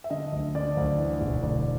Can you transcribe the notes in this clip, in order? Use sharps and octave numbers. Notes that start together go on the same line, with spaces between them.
E5
D3 D#5
D2
D3 D5
D2
E3
E1
D2 D5